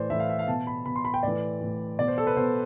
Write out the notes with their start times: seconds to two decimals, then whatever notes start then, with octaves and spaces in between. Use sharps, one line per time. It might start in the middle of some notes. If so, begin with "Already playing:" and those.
Already playing: A2 E3 C5 D5
0.10 A2 E3 E5
0.20 F5
0.29 E5
0.39 F5
0.47 B2 A5
0.67 B5
0.86 B2 B5
0.96 C6
1.05 B5
1.14 G5
1.23 A2 E3 D5
1.61 A2 E3
1.99 B2 D5
2.08 C5
2.18 A4
2.27 B4
2.36 B2 C5